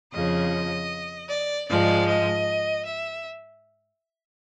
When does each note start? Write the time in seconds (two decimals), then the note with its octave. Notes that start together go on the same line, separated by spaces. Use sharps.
0.12 F2 C#3 F3 D#5
1.29 D5
1.68 G#2 F3 G#3 D5
2.07 D#5
2.85 E5